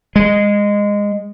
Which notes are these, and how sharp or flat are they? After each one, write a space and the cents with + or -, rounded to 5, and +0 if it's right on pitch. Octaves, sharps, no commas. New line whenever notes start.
G#3 -15